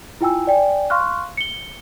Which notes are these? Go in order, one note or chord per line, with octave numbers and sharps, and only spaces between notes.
E4 F4 G5 G#5 E6
D5 G5 G#5
F5 C6 C#6 F6 F#6
C#7 G7